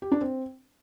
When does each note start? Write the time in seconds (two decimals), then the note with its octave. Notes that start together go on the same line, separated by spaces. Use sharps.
0.02 G4
0.12 D4
0.21 C4